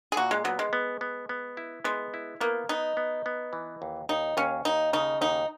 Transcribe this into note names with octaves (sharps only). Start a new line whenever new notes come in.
G#4
A#2 F#4
G#3
F#3 B3
G#3
B3
B3
B3
E4
G#3 B3
E4
A#3 B3
B3 D#4
B3
B3
E3
D#2
D#2 D#4
D#2 C#4
D#2 D#4
C#3 D#4
D#2 D#4